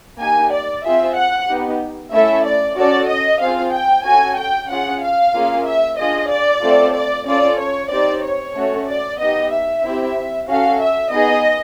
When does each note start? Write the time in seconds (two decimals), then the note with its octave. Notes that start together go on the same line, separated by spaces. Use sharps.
0.19 A#3 D#4 G4 G#5
0.52 D5
0.84 C4 F4 G#4 E5
1.15 F#5
1.48 B3 D#4 G4
2.12 A3 C#4 E4 A4 E5
2.44 D5
2.77 C#4 F#4 A4 D5
3.09 D#5
3.41 C4 F4 G#4 F5
3.72 G5
4.05 C#4 F#4 A4 G#5
4.37 G5
4.69 C#4 F4 G#4 F#5
5.01 F5
5.34 A#3 C#4 F4 G#4
5.65 E5
5.98 D4 F4 G#4 D#5
6.30 D5
6.62 A3 C4 F4 A4
6.94 D5
7.27 C#4 F4 A4 D5
7.59 C#5
7.90 C4 D#4 G4 D5
8.23 C#5
8.55 A3 C#4 F#4 A4
8.87 D5
9.19 B3 D#4 G4 D#5
9.52 E5
9.83 C4 E4 G4
10.47 C#4 F#4 A4 F5
10.80 E5
11.11 B3 D#4 G#4 D#5